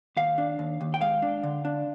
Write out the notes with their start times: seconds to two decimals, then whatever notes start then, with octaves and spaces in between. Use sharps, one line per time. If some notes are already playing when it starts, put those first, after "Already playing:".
0.17 D#2 F5
0.38 D4
0.59 D#2
0.81 D#2
0.94 G5
1.01 G#3 F5
1.22 D4
1.43 D3
1.65 D4